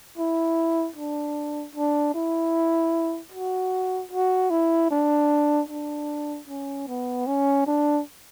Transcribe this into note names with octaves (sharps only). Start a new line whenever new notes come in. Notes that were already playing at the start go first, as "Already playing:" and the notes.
E4
D4
D4
E4
F#4
F#4
E4
D4
D4
C#4
B3
C#4
D4